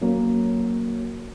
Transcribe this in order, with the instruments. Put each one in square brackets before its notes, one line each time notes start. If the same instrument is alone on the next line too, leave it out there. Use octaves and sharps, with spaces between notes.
[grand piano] F#3 A#3 C#4